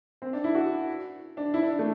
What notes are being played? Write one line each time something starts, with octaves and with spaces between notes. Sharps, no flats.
C4
D4
E4
F#4
D4
E4
D4
A3